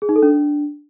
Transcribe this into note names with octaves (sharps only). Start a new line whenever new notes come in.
G#4
D#4
A4
D4